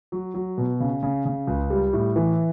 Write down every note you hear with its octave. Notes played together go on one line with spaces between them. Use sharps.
F#3
F#3
B2
C#3
C#3
C#3
C#2
G3
A2
E3